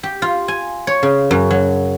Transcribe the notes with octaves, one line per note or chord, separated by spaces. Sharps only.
G4
F4
G#5
C#5
C#3
F#2
F#3